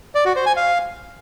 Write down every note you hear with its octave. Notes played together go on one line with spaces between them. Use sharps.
D5
F#4
C5
G#5
F5